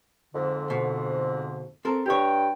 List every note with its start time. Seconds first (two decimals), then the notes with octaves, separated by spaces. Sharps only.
0.33 F2 G#2 D3
0.70 B2
1.85 C4 A4 A#4
2.06 G2 G4 C#5 G5